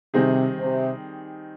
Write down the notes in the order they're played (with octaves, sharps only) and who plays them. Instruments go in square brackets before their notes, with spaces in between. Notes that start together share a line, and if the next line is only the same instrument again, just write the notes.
[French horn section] C3 [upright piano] D#3 G3 C4 D#4 G#4
[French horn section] C3